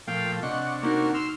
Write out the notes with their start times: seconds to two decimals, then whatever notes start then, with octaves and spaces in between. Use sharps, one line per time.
0.07 A#2 F3 A3 F5 G5
0.43 C3 D4 D#5 F#5 C#6
0.83 A#3 D#4 F#4 A#4
1.14 C6 E6 F6